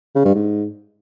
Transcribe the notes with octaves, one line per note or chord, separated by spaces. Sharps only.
C#3
G2
G#2